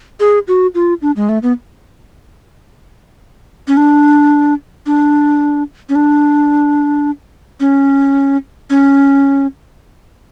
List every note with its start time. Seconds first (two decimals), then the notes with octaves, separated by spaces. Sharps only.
0.20 G#4
0.48 F#4
0.75 F4
1.02 D4
1.16 G#3
1.29 A3
1.43 B3
3.68 C#4
3.77 D4
4.86 D4
5.89 C#4
5.95 D4
7.60 C#4
8.70 C#4